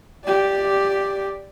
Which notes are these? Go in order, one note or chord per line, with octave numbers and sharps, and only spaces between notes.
G4 D5